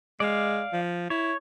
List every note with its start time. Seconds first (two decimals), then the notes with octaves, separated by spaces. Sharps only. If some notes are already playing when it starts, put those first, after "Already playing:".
0.20 G#3 D5 F5
0.73 F3
1.10 E4 C#5